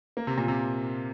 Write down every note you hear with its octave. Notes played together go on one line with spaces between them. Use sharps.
A#3
C3
A#2
C3